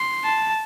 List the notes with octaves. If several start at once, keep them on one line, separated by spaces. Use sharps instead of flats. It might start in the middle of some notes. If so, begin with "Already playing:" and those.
Already playing: C6
A5